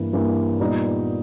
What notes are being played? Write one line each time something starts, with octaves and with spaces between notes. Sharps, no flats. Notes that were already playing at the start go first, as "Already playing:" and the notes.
Already playing: G2 E3 A#3
G2 E3 A#3
A#2 G3 B3 D#4